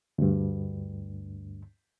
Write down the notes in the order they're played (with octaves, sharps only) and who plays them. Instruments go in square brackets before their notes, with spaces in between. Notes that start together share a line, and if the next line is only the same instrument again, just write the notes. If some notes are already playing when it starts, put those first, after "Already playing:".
[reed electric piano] D2 G2